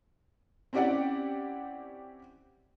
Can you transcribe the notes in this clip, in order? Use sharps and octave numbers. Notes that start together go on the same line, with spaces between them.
C4 C#4 E4 G4 D5 F#5